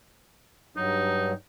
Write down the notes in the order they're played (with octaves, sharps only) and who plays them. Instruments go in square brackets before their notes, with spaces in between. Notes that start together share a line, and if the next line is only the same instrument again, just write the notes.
[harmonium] G2 F#3 [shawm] D#4